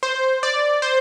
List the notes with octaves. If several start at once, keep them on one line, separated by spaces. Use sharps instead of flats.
C5
D5
C5